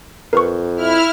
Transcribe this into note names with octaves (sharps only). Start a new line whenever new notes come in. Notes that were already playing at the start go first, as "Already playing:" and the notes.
F2 A#4 B4 C#6
E4 F6